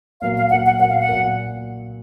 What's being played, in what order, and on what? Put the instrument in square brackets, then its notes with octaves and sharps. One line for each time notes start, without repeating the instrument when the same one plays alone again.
[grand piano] A#2 F#3 A#3 [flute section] F5
[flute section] F5
[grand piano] A#2 F#3 A#3 [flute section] F#5
[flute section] F#5
[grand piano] A#2 F#3 A#3 [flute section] F#5
[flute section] F5
F#5
[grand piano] A#2 F#3 A#3